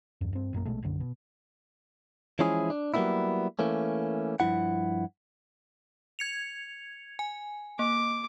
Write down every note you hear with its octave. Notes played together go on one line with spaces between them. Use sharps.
E2 G2
G2 C4
A#1 F#2 D#3 A#3
A#1 B2 G#3 A3
F#1 B1 F#2 D3
B2
E3 F3 G#3 C#4 E4 G#4
D4
F#3 G3 A#3 B3 D#4 E4
E3 A3 A#3 C#4
G2 F3 E4 F#5
G#6 C#7 F7
G#5
A#3 D6